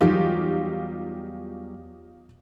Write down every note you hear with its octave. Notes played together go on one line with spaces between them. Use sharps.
E2 F#3 G3 D#4 F4 G4